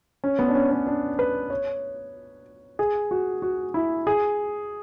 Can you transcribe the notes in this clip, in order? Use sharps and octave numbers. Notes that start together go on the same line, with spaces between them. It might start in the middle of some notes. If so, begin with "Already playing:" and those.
C#4
B3
D4
C#4
C#4
D4
B4
C#5
G#4
F#4
F#4
E4
G#4